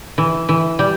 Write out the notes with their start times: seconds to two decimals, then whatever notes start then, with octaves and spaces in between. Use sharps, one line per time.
0.18 E3
0.49 E3
0.79 G3